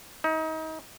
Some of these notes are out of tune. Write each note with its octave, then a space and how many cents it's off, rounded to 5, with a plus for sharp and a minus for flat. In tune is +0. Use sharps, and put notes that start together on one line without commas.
D#4 +30